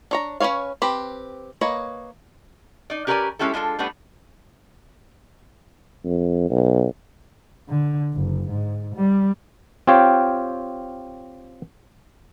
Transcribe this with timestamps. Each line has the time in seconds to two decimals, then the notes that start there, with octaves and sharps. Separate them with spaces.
0.11 D4 C#5 A#5
0.40 C#4 G#4 B4 C#5 F5
0.82 C4 G4 B4
1.61 A#3 B4 C#5 D#5
2.90 D#4 D5
3.07 C#4 G4 A#4 B4 D5 G#5
3.39 G#3 C#4 E4 G4 A4
3.54 G#3 D4 F4 A4
3.79 G3 A3 B3 D4
6.04 F2
6.50 B1
7.68 D3
8.14 F#1
8.49 G#2
8.95 G3
9.87 C4 F4 G4 C#5 F5 G5